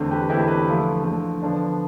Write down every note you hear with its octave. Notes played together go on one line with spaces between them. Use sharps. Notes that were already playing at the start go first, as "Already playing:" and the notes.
Already playing: E2 D3 A3 C4
G4 B4
E2 D3 A3 C4 E4 G4
G4 B4
D3 F3 A3
D3 F3 A3
D3 F3 B3 D4